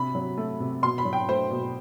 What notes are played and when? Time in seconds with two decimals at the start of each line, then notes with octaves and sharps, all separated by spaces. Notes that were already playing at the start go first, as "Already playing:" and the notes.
Already playing: C3 B5
0.15 F#3
0.37 A3
0.60 C3
0.82 B2 C6
0.98 B5
1.05 F#3
1.13 G5
1.28 A3 C5
1.51 B2